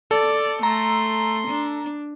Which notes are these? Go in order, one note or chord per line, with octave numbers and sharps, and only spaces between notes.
A4 D5
A3 A#5 C6
D4